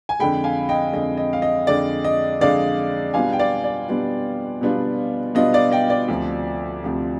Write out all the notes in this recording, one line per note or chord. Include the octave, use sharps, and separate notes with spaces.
G#5
F2 D3 G#3 G5 B5
F5 G#5
D#5 G5
F2 D3 G#3 D#5
D#5
F5
D#5
F2 D3 G#3 D5
D#5
F2 D3 G#3 D5 F5
B2 G3 B3 D4 F4 F5 G#5
G5
D5 F5
D5
B2 G3 B3 D4 F4
B2 G3 B3 D4 F4
B2 G3 B3 D4 F4 D#5
D5 F5
D#5 G5
D5
D2 C3 F3
D2 C3 F3